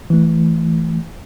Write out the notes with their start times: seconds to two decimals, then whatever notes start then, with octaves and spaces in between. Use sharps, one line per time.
0.10 E3 A3